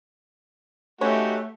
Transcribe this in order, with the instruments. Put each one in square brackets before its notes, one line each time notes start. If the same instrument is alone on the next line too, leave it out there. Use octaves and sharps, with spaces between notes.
[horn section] A3 [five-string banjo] C#4 B4 C#5 [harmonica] D#4 F#4 G4